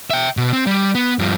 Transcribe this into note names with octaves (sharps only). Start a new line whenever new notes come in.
E5 G5
B2
C4
G3
B3
G2 F3